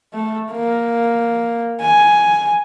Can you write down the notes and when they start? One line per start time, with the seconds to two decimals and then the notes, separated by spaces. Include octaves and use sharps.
0.14 A3
0.52 A#3
1.81 G#5